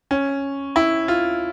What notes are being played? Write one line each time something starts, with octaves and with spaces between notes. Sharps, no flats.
C#4
E4
F4